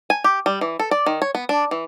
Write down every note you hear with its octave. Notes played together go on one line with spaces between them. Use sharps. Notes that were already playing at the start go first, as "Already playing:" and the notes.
G#5
G4
G3
E3
A4
D5
D#3
C#5
B3
D4
E3